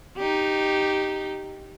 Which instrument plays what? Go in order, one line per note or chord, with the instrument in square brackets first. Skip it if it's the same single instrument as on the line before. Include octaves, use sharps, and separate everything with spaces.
[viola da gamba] D#4 G4